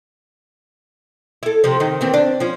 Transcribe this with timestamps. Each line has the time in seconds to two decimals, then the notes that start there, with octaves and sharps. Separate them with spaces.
1.43 E4 A4
1.64 C3 F3
1.80 D#3 D#4
2.01 D#3 E3 C4
2.14 D4
2.40 F3 C#4